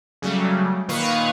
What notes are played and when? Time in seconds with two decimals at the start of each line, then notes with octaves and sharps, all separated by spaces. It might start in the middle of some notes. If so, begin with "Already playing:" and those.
0.22 C#3 F#3 G3 A3
0.88 A#2 D#3 B4 F5 C#6 D#6